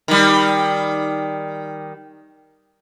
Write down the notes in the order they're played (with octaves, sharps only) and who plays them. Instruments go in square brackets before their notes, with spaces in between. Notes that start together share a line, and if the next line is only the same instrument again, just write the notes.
[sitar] D#3 G3